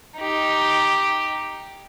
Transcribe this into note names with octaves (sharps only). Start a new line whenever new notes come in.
D#4 G4